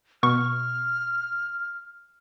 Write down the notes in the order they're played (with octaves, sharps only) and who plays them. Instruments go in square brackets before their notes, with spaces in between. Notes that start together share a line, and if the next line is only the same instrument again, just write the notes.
[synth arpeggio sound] B2 C#6 [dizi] F6